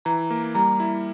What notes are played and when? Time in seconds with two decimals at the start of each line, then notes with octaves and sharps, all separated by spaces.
0.05 E3 A#5
0.30 A#3
0.55 G3 A#5
0.80 E4